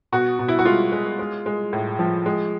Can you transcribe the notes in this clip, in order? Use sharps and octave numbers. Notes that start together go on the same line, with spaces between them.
B2 F#4
B2
E4
F#4
G#3 F4
G#3
G#3
G#3
A2
F3
G#3